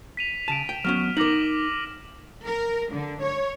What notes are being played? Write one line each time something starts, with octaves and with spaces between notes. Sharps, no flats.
B6 D#7 F7
C#3 A5 D7 E7
G5
F#3 B3 C#4 F6
D#4 A#4 D6 A#6 F#7
A#4
D3
C#5